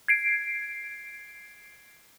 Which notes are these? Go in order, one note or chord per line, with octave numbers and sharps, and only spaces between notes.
G#6 C7 D7